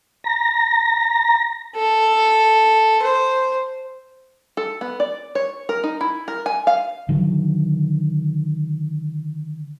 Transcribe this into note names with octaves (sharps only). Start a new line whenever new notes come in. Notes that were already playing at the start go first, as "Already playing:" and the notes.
A#5
A4
C5
A4
B3
D5
C#5
A#4
D#4
E4
A#4
G#5
F5
D3 D#3 F#3